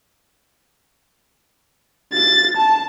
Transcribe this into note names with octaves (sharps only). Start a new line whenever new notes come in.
A6
A5